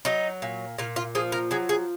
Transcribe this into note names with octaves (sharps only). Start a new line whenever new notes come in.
F#3 D#4
A#2
A#2 F4
F4
F3 G#4
A#4
F#3 G#4
G#4